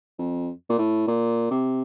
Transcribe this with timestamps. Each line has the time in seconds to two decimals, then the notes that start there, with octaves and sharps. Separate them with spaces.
0.19 F2
0.69 A#2
0.78 A2
1.07 A#2
1.51 C3